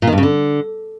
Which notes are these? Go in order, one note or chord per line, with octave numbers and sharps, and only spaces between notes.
A#2
D#3
G2
C#3
D3